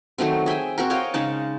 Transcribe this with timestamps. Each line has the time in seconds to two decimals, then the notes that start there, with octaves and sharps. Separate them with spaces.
0.18 D#3 F#3 A3 C4
0.46 G#4 E5 G5 G#5
0.78 C4 F#4 A#4
0.90 C#5 D#5 F5 G5
1.14 C#3 G#3 D#4 A5